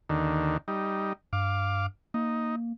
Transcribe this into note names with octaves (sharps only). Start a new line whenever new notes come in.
D#2 D3 D#3
G3 D#4
G2 F5 D6
A#3 D#4